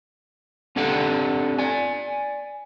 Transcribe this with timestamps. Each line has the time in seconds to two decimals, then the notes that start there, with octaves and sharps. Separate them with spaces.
0.76 C4 D4 G4 A4 F#5 G5
1.59 D5 G#5